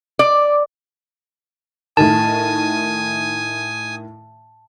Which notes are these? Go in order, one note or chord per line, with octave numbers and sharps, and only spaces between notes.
D5
A2 D#3 G#5 A5 D#6